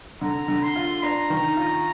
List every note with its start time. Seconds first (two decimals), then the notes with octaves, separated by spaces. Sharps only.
0.21 D3 A#5
0.48 D3
0.63 C6
0.76 F4
1.03 D4 A#5
1.30 D#3
1.57 F4